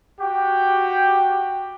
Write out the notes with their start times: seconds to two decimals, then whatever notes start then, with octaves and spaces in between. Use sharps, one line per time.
0.21 F#4 G4 G5